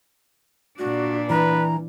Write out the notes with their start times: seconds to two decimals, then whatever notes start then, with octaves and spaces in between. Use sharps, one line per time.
0.79 A#2 D4 F#4
1.30 E3 B4 A#5